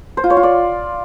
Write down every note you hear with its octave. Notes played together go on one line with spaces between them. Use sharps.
C5
F4
C#5
F4
D5